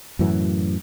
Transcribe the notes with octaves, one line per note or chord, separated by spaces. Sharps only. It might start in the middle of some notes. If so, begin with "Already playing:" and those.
F#2 A2 E3 F#3